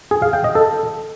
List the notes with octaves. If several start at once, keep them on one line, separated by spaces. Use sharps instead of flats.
G#4
F5
G5
D#5
A4